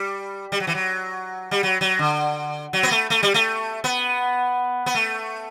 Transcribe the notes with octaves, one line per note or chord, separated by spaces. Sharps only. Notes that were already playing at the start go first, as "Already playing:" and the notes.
Already playing: G3
G3
F#3
E3
F#3
G3
F#3
F#3
D3
F#3
B3
A3
A3
G3
A3
B3
B3
A3